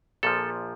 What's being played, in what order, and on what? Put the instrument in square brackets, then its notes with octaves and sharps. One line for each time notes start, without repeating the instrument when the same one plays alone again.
[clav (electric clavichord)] A#1 A#2 F3 A4